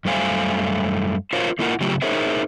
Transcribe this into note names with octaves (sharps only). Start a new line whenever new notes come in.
F#2 G3 A3 C5 F5 G#5
F4 A#4 C5 C#5 F5
A3 A#3 E4 F4 A#4 F#5
C#3 F#3 A3 F4 G4
D#4 G#4 A#4 C5 C#5 E5